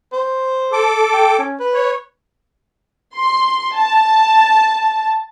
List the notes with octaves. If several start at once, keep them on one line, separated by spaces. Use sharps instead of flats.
C5
A4 D6
G5
C#4
B4
C#5
C6
A5